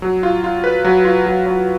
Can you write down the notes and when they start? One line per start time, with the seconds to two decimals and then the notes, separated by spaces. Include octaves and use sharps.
0.02 F#3
0.23 F4
0.44 F4
0.64 B4
0.85 F#3
1.05 F4
1.26 F#3
1.46 F#3